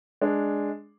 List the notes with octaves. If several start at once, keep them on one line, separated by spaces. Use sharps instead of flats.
G#3 D4